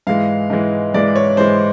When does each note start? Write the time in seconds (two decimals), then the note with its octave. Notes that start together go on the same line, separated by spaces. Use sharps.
0.07 G#2 E3 G#3 F5
0.50 G#2 E3 G#3
0.94 G#2 E3 G#3 D5
1.16 C#5
1.37 G#2 E3 G#3 C5